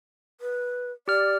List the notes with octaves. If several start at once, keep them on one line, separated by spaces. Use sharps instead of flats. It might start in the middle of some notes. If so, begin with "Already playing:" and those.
B4
G4 D5 F6